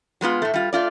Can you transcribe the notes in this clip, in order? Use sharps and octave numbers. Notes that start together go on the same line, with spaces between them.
F#3 G#3 B3 F4
A2 A3
G3 F4
A3 F4 D5